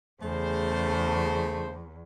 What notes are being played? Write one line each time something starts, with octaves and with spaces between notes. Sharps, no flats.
E2 C#3 A3 G#4 C5